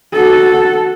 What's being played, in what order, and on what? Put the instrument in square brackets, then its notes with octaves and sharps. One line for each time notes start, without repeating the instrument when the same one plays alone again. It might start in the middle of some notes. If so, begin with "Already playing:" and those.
[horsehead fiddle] F#4 A4